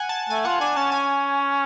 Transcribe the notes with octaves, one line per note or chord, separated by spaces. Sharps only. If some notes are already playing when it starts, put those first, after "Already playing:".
Already playing: F#5 G#5
A5
A3 G#5
F4 F#5
D4 G#5
C#4 A5
C#4 G#5